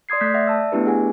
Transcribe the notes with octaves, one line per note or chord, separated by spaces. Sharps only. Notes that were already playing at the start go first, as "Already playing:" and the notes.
D5 C6 D#6 G#6 C7
A3 D5 D#6 F#6 G6 B6
D5 E5 F#5
A5 E6
A3 B3 D4 E4 G4 B4
G#4 F#5 G#5